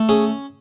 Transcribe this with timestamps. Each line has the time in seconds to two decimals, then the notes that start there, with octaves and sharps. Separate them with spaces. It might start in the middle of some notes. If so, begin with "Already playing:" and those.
Already playing: A3
0.09 C#4 G#4